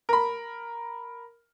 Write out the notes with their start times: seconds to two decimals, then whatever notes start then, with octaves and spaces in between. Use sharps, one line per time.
0.09 A#4 B5